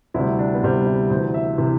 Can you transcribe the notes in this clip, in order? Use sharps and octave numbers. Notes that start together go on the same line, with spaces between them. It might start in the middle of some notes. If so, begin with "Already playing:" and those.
D2 C3 G3 E4
D4
B3
D2 C3 G3 C4
E4
D2 C3 E3 C5
E5
C3 E3